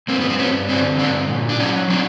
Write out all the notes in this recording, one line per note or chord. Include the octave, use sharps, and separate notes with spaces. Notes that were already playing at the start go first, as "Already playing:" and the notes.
G2 A#3 C4
B3
C4
G2 B3 C#4
D3 C4 D4
G2 C4 D4
A#2
D4
F#3 C#4 D#4
F#3 C4 D4